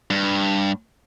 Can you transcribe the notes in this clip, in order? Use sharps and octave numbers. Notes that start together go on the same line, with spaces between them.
G2